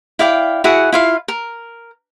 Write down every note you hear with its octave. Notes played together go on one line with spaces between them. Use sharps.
E4 D5 F5 G5
E4 F#4 G#4 F#5
E4 F4 F5
A#4